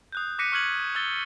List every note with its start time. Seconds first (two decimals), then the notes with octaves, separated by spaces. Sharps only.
0.12 D#6 F#6 G6
0.39 D6 F#6 A#6 B6 C#7 D#7
0.52 C#6 F6 F#6 G#6 F#7
0.95 D#6 E6 A6 G7